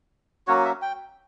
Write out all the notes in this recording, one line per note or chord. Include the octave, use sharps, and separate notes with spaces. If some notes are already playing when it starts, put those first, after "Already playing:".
F#3 A#3 C#4 F#4 C#5
E5
G5